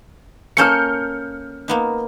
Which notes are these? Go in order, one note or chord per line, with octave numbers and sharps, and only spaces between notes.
A#3 C#4 A4 F6 G6 C#7
A#3 B3 D#4